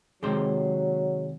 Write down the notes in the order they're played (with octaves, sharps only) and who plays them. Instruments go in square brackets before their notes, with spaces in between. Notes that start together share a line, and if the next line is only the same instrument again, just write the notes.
[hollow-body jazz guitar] C3 D#3 C5 [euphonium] F#3 [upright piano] G#3